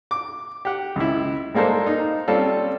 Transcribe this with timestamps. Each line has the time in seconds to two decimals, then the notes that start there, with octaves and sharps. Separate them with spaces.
0.11 D6
0.65 G4 F#5
0.96 C#2 E4
1.54 G3 G#3 A#3 A4 C5
1.87 D#4
2.28 G3 C4 C#4 F4 A4